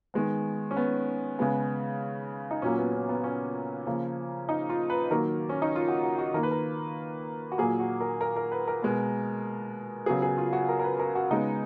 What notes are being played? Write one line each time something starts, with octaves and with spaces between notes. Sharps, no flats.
D#3 G#3 B3
C#4
B3
C#3 G#3 B3
D#4
A#2 F#3 A#3 C#4
B3
C#4
B3
C#4
C#3 F3 A#3
D#4
F4
B4
D#3 F#3 A#3 A#4
C#4
D#4
F4
F#4
F#4
F#4
D#3 A#3 A#4
B4
A#4
F#4
A#2 F#3 A#3 G#4
F#4
A#4
A#4
A#4
B4
A#4
B2 G#3 B3
C#3 F#3 B3 G#4
G#4
F4
F#4
A#4
A#4
B4
A#4
F#4
C#3 G#3 B3 D#4